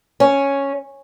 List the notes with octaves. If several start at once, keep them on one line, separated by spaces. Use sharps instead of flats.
C#4